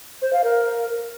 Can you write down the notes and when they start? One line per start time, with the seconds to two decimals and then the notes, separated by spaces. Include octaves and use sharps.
0.22 C5
0.33 F5
0.44 A#4